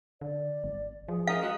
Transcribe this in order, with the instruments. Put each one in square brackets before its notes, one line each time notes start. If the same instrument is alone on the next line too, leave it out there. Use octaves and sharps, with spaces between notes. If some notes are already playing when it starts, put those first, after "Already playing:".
[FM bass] D3 [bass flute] D5
[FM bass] G#1
[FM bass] F3 [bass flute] G#4
[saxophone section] A#4 D#5 [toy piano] F5
[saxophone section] G#3 F#4